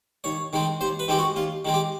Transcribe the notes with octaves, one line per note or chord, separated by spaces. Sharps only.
D#2 C#5
D#3 G#3 C4
D#2 C5
B4
D#3 G#3 C4 G4
F#4
D#2 F4
D#3 G#3 C4
G4